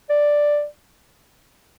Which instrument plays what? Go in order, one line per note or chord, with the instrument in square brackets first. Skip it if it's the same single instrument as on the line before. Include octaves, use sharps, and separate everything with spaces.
[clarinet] D5